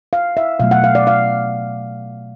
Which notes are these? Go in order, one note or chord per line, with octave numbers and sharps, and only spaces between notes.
F5
E5
B2 F#3 A3 F5
F#5
F5
D5
F5